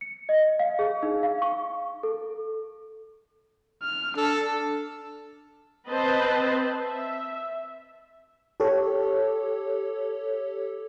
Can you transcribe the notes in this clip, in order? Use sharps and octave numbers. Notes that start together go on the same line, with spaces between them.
C#7
D#5
F5
G#4
D#4
F5
C#6
A4
F6
D4 A4
C4 B4 C5 D#5 A5
E5
G4 A4 C#5